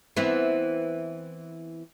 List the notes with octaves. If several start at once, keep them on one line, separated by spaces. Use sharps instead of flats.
E3 B3 C4